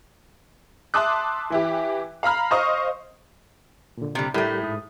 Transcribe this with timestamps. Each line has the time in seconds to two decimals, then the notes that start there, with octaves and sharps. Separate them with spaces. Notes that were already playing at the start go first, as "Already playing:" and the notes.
0.94 E5 A5 C6 D6 D#6 F#6
1.50 E3 E4 G4
2.23 F5 A#5 B5 F6
2.51 C5 D#5 F5 C#6 D#6
3.97 A#2 D3
4.15 C3 G3
4.34 A2 G3 A3 G4 A#4
4.63 G#2 D#6